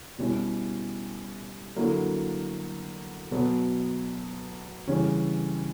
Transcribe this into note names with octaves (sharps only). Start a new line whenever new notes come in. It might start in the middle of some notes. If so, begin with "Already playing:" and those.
B2 G3 C#4 E4
D3 F#3 A#3 E4
B2 F#3 B3
C#3 E3 G3 C#4